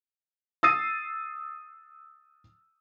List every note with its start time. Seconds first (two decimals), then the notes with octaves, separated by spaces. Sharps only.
0.63 D#6 E6 A6 C7 D#7